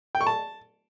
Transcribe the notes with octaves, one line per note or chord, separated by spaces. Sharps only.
G5
C#6
A5